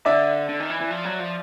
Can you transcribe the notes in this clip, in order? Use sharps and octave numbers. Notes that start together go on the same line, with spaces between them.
D3 D5 E5
D3
D#3
E3
E3
F3
F#3
F3